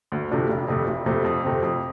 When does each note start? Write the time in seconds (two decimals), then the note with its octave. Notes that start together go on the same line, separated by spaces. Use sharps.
0.12 D2
0.31 C3 F3 A3 D4
0.49 F1
0.68 F2 C3 A3
0.88 F1
1.06 F2 C3 A3
1.25 F2
1.43 C3 A3 C4
1.62 F2